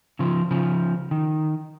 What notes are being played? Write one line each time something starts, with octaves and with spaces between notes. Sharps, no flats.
C#3 F3
C#3 F3
D#3